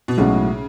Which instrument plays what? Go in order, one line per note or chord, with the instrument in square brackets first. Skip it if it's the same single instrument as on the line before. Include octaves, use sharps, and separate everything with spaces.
[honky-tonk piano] B2
[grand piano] B1 A2 G#3 C#4 F#4 [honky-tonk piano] C#3